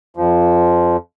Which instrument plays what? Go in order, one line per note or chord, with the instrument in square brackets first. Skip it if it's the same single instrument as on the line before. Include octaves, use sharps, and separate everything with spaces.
[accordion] F2 F3